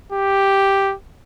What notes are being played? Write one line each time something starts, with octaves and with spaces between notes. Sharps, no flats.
G4